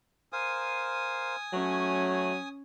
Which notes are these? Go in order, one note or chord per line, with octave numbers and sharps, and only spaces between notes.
A#4 C5 F5 G#5 D#6
F#3 A3 C#4 C#5